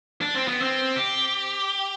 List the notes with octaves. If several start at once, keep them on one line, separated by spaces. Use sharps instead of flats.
D4
C4
B3
C4
G4